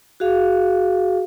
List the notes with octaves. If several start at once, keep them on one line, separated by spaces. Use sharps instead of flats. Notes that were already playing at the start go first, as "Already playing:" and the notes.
F#4 G#4 F5